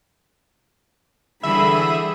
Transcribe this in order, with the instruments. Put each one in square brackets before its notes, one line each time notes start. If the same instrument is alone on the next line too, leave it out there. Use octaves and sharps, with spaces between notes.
[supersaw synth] D3 D#7 [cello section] E3 G3 G#4 [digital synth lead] E5 [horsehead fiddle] B5